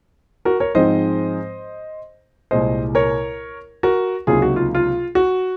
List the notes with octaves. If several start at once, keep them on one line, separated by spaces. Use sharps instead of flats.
F#4 A#4
A#4 C#5
G#2 F3 G#3 C4 D#4 C5 D#5
C2 A#2 G#3 C5 D#5
A#4 C#5
F#4 A#4
C#2 C3 F#3 A#3 D#4 F4 G#4
F#4
F4
F4
F#4